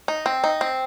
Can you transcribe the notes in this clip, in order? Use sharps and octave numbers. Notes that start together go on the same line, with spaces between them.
D#4
C4
D#4
C4